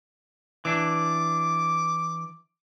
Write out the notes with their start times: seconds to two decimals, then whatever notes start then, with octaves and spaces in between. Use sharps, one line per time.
0.65 E3 D4 D6